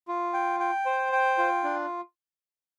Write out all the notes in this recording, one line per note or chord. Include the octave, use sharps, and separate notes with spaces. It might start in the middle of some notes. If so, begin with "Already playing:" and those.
F4
G5
G5
C5
G5
F4
D4